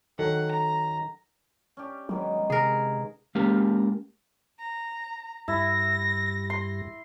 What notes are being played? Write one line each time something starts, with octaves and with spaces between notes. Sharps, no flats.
D#3 F#3 A4 F#5
A#5
C#4 D4 G4
G#2 D#3 F#3 B3
C3 G#4 A#4
G#3 A#3 C#4 G4 A#4
A#5
G2 G3 E4 A#6
C6